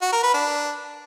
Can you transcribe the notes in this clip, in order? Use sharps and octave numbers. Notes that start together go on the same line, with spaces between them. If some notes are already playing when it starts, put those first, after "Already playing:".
F#4
A#4
B4
D4